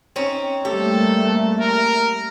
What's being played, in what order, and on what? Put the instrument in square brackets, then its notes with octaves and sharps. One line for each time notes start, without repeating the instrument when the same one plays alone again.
[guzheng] C4 C#4 D#4
[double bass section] G3 A3 A#3 [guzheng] G4 [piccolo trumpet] A4
[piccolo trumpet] A#4